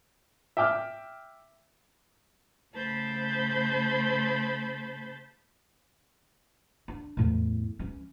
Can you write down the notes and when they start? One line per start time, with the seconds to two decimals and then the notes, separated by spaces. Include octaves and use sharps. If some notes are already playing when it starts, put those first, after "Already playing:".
0.57 E5 G5 D6 F6
2.75 C#3 A3 C5 A5 B5 G6
6.88 D4
7.17 E2 A2
7.79 E3 C#4